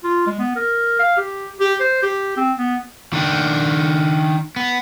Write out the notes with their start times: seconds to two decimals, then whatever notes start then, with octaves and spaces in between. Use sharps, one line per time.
0.04 F4
0.27 G#3
0.39 B3
0.56 A#4
0.99 F5
1.17 G4
1.60 G4
1.80 C5
2.03 G4
2.37 C4
2.58 B3
3.13 D#3 D4
4.56 B3